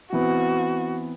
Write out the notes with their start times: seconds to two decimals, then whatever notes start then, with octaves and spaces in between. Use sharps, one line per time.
0.12 E3 B3 C4 F#4